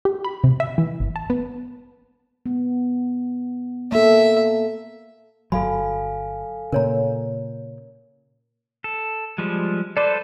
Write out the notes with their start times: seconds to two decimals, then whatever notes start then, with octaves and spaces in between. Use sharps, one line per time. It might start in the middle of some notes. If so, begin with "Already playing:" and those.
0.05 G4
0.25 B5
0.44 C3
0.60 E5
0.78 E3
1.00 G1
1.16 A5
1.30 B3
2.46 B3
3.92 A#3 A4 E5
5.52 G1 C2 F#3 A4 F5 G#5 B5
6.72 A#2 C#3 A#4 C#5 A#5
8.84 A4
9.38 F3 G3 G#3
9.97 A4 B4 C5 D5